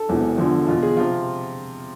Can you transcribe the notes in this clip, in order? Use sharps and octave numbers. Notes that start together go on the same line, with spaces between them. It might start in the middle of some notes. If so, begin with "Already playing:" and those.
Already playing: A4
E1 E2 C3 E3
E2 D3 F3
E2 B2 F4
G#4
C3 F3 F4